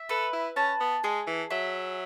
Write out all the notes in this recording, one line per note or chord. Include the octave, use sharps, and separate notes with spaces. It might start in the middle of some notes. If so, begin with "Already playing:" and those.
Already playing: E5
A4 B4
E4
C#4 A5
B3
G#3 G#4
E3
F#3 E5